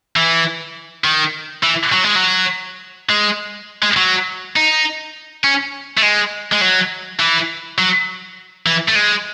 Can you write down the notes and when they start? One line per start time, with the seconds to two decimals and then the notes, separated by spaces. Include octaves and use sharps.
0.16 E3
1.04 D#3
1.63 E3
1.92 F#3
2.04 G#3
2.15 F#3
3.09 G#3
3.83 G#3
3.97 F#3
4.56 D#4
5.44 C#4
5.98 A3
6.03 G#3
6.52 G#3
6.61 F#3
7.20 E3
7.78 F#3
8.66 E3
8.88 A3
8.95 G#3